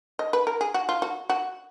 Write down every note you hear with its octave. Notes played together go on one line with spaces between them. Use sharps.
D#5
B4
A#4
G#4
F#4
F4
F#4
F#4